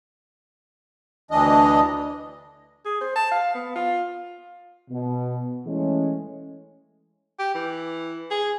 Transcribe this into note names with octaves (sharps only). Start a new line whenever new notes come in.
D2 E3 D4 D#5
G#4
C5
A5
F5
B3
F4
B2
E3 G#3 A3 C#4
G4
E3
G#4